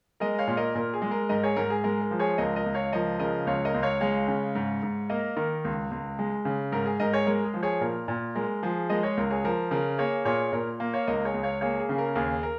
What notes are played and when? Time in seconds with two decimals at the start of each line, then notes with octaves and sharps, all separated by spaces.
0.20 G#3 A#4 D#5
0.39 C#5 F5
0.48 A#2
0.57 A#4 D#5
0.75 A#2 A#4
0.94 G#4
1.02 G#3
1.11 A#4
1.29 G#2 A#4 D#5
1.43 G#4 C#5
1.56 G#2 A#4
1.70 G#4
1.84 G#3 A#4
2.01 A#4
2.11 F3
2.19 G#4 C#5
2.38 C#2 A#4 D#5
2.56 A#4 D#5
2.66 C#2
2.74 C#5 F5
2.92 F3 A#4 D#5
3.19 C#3 A#4 D#5
3.46 C#2 C#5 F5
3.65 A#4 D#5
3.74 C#2
3.83 C#5 F5
4.01 G#3 C#5 F5
4.28 C#3
4.55 G#2
4.83 G#2
5.09 A#3 A#4 D#5
5.37 D#3 A#4
5.65 C#2
5.91 C#2
6.19 G#3
6.45 C#3
6.72 G#2 A#4
6.86 G#4
7.00 G#2 A#4 D#5
7.13 G#4 C#5
7.27 G#3 A#4
7.45 G#4
7.54 F3
7.63 G#4 C#5
7.81 A#2 A#4
8.08 A#2
8.35 G#3 A#4
8.63 F3 G#4
8.90 G#3 A#4 D#5
9.03 G#4 C#5
9.17 C#2 A#4
9.31 G#4 C#5
9.44 F3 A#4
9.71 C#3 A#4
9.98 A#3 G#4 C#5
10.25 A#2 G#4 C#5
10.53 A#2 A#4
10.80 A#3
10.93 C#5 F5
11.07 C#2 A#4 D#5
11.25 G#4 C#5
11.34 C#2
11.43 C#5 F5
11.61 A#3 G#4 C#5
11.80 G#4
11.89 C#3
11.98 A#4
12.15 D#2 G#4
12.43 A#4